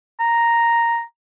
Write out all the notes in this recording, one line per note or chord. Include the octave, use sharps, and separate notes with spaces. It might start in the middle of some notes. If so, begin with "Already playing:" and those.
A#5